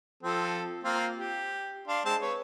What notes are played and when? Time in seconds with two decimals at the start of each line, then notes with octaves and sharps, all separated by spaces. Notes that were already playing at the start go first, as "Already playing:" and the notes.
0.23 F3 C4 A4
0.84 A#3 C4 F4
1.17 G4
1.88 D4 F5 C6
2.05 G#3 C4 A5
2.21 B4 C#5